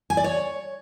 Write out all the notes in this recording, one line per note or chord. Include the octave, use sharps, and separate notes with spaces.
G#5
D5
C#5